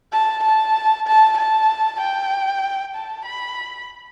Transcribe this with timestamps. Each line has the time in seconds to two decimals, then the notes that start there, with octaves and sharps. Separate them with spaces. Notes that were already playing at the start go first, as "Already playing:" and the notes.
0.13 A5
0.44 A5
1.07 A5
1.38 A5
2.01 G5
2.95 A5
3.26 B5